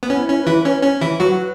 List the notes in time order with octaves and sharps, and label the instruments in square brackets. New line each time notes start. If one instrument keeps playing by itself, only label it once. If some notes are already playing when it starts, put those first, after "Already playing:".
[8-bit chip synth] B3
[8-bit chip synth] C#4 [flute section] E4
[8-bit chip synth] C#4
[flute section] B4
[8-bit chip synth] E3 E4
[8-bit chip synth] C#4 [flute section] C#5
[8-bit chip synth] C#4
E3 E4
[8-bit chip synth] F#3 F#4 [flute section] B4